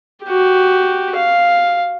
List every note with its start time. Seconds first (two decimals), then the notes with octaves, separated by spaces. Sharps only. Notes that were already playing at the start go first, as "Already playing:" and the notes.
0.24 F#4 G4
1.16 F5